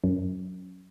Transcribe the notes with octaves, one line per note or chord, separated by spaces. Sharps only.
F#2